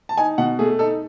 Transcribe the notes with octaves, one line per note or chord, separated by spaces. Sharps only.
A5
D#4 G#5
B2 F#5
A3 G#4
D#4 A4